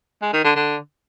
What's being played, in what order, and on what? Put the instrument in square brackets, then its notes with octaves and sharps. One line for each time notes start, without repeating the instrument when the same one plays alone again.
[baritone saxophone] G#3
D#3
D3
D3